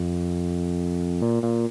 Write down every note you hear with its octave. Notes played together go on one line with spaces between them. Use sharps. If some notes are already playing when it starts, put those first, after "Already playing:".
Already playing: F2
A#2
A#2